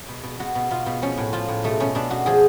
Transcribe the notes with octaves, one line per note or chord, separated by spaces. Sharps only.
B2
B2
B2 F#4
B2
B2 F4
B2
F3 C#4
A2
F3 F4
A2
B2 A3
B2 C#4
B2 D4
B2 F#4
F3 G#4